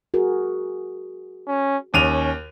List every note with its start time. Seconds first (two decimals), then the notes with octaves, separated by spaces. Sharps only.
0.14 F#4 G#4 A#4
1.47 C#4
1.94 D#2 C#4 D#7 F7